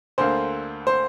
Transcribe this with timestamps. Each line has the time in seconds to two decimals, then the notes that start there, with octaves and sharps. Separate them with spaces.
0.18 D2 D3 A#3 C5
0.87 C5